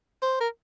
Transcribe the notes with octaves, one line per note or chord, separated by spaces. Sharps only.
C5
A#4